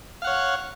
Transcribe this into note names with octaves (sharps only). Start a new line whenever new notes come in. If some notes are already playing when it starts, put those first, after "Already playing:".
C#5 F5 F#5